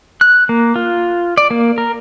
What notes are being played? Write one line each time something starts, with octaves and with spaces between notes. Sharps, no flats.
F#6
A#3
F4
D5
A#3
A#4